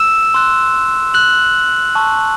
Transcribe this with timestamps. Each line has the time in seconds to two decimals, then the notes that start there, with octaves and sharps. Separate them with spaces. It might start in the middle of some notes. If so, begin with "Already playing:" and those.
Already playing: E6 E7
0.34 C6 F#6
1.14 F#6 F#7
1.95 A5 C#6 E6